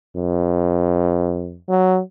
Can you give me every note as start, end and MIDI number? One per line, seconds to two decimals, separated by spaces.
0.16 1.58 41
1.69 2.00 54